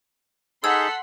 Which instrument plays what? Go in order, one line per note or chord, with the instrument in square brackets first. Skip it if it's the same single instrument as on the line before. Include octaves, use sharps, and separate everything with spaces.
[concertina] D#4 G#4 [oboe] A4 [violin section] F#5 C6 B6 [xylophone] E6 G#6